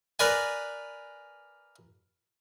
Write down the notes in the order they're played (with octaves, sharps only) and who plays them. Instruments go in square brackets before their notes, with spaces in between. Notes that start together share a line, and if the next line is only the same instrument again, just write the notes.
[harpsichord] A#4 B4 D5 G#5